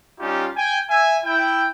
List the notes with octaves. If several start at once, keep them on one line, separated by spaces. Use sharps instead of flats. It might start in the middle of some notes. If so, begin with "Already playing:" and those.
G3 C#4 D#4 F4 G4
G5 G#5
E5 G#5
E4 G5